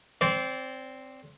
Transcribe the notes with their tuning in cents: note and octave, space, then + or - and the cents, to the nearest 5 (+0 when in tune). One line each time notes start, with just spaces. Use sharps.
C4 +0 D5 -30